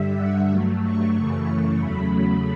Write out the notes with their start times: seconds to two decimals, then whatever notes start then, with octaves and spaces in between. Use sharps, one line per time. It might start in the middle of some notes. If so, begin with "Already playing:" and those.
Already playing: G2 D3 G3 E5
0.17 F#5
0.49 G2 F#3 A3
0.82 C#6
1.14 F#2 C#3 E3 A3
1.80 E2 C#3 F#3 A3 B5